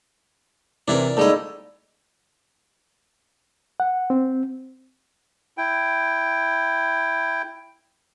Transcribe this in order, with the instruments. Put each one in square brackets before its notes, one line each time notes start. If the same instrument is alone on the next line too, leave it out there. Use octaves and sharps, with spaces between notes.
[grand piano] C3 E3 C4 [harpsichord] D4 E4 A#4 [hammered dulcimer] D5
[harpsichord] G#2 G3 D#5 [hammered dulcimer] A3 E4 [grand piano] A#3 D#4
[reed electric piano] F#5
C4
[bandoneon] E4 G5